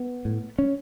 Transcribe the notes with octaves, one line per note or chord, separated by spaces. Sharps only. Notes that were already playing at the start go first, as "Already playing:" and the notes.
Already playing: B3
A2
C#4